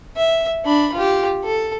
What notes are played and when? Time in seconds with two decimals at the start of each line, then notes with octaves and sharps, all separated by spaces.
0.17 E5
0.65 D4 B5
0.94 F4 G4
1.44 A4